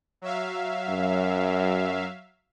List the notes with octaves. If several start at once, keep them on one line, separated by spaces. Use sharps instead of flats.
F#3 E5 F5
F#2